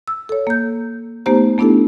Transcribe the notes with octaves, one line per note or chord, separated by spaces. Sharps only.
E6
A4 C#5
A#3 G6
A3 B3 D#4 G4 C5 A#5
A3 B3 D4 E4 G4 A4